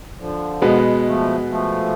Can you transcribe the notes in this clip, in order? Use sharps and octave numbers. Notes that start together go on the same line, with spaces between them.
D3 F3
B2 G#3 B3
F3 A3
F3 A3